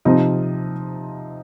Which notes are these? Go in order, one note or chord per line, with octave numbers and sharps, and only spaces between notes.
C3 F3 C4 D#4